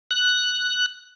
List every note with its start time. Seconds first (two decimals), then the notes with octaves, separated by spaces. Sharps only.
0.11 F#6